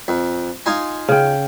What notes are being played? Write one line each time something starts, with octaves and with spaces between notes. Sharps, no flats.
F2
D#4 F4 G#5
C#3 G5